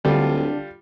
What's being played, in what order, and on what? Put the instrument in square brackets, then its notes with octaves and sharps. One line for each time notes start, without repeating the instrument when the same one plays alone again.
[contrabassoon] D1 [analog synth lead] D3 [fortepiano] G3 F4